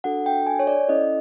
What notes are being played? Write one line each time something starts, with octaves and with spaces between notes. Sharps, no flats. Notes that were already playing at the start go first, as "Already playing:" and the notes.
D4 F#4 A4 F#5
G5
G#5
C#5
D5
C#4 E4 A4 D#5